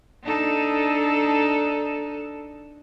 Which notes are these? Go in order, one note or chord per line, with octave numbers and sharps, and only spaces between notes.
D4 D#4 A4